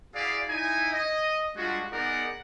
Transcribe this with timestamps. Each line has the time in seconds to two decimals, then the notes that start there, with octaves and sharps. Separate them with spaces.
0.15 E4 F#4 G#4 D5 F5
0.48 D#4 E4 G#5
0.93 D#5
1.56 G3 G#3 D4 F4 F#4
1.92 B3 D#4 G#4 A#4 D5 F#5